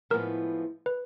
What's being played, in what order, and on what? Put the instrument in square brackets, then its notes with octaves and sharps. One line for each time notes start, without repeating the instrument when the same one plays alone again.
[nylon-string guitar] A2 F3 G#3 B3 [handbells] A#4
[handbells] B4